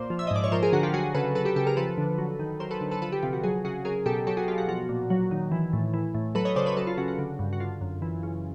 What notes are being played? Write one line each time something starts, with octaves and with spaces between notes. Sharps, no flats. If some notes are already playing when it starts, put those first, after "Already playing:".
Already playing: A#2 C5 D5
F3
E5
D#5
G#2 D5
C#5
F3 A#4 C5
G#4 A#4
D3 F#4 G#4
F4 G4
F#3 F#4 G#4
C#3 A4 B4
F#3 A4 B4
G4 A4
C#3 G4 A4
G#4 A#4
F3 A4 B4
D3
F#3
D#3
F#3 A#4 C5
A4 B4
D3
A4 B4
F3 A4 B4
G4 A4
C3 F4 G4
F#4
F#3 F#4 G#4
C#3 F#4 G#4
F#3 G#4 A#4
B2 G4 A4
F#3 G4 A4
F#4 G#4
B2 F4 G4
F#4
F3 F#4
A#2
F#3
D#3
E3
A2
E3
A2
F#3 A4 B4
C#5 D#5
C#3 C5 D5
B4 C#5
F#3 A4 B4
F4
C#3 F#4
F#4
D3
G2
F#4
D3 F4
F#2
E3
C#3